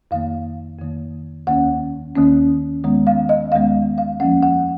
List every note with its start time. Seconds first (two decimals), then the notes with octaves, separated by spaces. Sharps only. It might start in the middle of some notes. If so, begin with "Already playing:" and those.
0.11 F2 D#3 A#3 F5
0.79 F2 D#3 A#3
1.47 D#2 D#3 A#3 C#4 F#5
2.15 D#2 D#3 A#3 C#4
2.84 D#2 D#3 G#3 B3
3.07 F5
3.29 D#5
3.52 D#2 D#3 G#3 B3 F5
3.98 F5
4.20 F2 F3 A#3 C#4 F#5
4.43 F#5